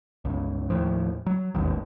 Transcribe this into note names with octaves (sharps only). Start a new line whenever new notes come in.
G1 C#2
D#2 A2 F3
F#3
E1 A1 D#2